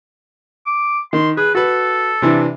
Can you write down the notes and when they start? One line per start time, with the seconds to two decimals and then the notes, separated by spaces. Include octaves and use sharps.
0.66 D6
1.13 D#3 C6
1.37 G#4 B4
1.55 F#4 A4 B4
2.22 C3 E3 D4